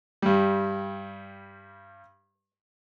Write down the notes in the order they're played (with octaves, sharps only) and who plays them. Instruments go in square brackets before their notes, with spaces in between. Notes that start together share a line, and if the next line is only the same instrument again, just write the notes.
[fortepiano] G2 G3